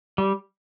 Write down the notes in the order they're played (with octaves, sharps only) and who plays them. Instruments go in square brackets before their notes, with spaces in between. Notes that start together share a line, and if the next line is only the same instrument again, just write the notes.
[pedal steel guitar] G3